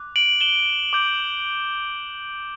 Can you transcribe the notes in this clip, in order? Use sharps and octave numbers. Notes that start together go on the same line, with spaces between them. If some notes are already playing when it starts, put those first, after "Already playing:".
Already playing: D6 F#6
D7 F#7
E7 G7
D6 G6